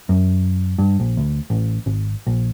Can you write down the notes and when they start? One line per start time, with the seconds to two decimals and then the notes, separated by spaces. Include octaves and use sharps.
0.09 F#2
0.79 G2
1.00 A#1
1.17 D2
1.50 A1
1.86 G#1
2.27 A#1